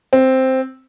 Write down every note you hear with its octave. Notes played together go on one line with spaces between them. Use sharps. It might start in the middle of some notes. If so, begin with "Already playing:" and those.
C4